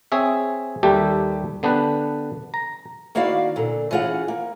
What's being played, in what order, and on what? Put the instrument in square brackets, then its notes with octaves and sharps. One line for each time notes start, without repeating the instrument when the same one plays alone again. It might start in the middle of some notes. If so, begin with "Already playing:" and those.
[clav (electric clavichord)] C4 G#4 C#5 E5
D#2 G3 G4 A4 E5
D3 B3 D4 G4 B4
A#5
[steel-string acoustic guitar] D#3 A#3 E4 F#4 D5 F5
A#2 D3
E3 C#4 F4 G#4 F#5
A#3